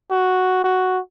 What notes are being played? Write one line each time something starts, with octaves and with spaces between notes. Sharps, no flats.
F#4
F#4